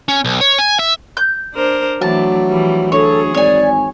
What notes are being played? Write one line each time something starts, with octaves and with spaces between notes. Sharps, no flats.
C#4
B1
C#5
G#5
E5
G6
D4 A#4 C5
E3 F#3 A3 D4 A5
E3 F3 G3
D2 F#3 G#4 A4 C#5
G#1 C#5 D5 G#5